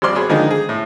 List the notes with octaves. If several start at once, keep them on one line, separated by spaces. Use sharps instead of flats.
G#1 G3 C4 D5 C6 F6
F#4 G#4 C#5 B5
D3 D#3 F3 G#3 D#4 G#5
G#4
A2